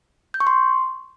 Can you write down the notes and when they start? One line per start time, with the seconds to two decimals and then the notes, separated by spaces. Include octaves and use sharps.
0.34 G6
0.40 C#6
0.47 C6